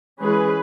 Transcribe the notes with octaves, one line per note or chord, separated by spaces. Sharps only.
E3 G#3 C#4 G#4 B4